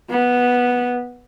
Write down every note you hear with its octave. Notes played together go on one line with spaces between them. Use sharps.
B3